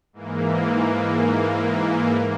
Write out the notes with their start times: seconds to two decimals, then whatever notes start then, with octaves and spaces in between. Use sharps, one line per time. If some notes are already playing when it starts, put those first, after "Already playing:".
0.13 G#2 E3 A#3